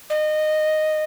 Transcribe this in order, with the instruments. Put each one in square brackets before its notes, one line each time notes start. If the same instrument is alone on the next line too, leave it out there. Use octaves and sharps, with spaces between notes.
[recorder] D#5